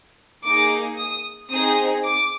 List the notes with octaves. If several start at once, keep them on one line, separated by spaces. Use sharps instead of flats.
A#3 D#4 G#4 D6
D#6
C4 D#4 G#4 D#6
D6